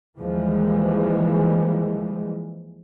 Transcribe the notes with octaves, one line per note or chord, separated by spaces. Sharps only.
D#2 E3 F3 G3 G#3